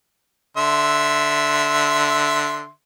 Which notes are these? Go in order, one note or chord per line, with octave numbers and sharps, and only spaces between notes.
D3 E5 C6